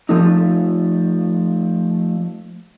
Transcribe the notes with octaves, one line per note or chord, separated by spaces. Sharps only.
F3 A3 D#4